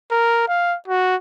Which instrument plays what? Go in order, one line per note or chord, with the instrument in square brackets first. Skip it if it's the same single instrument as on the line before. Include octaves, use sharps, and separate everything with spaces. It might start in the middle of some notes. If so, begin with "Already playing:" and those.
[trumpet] A#4
F5
F#4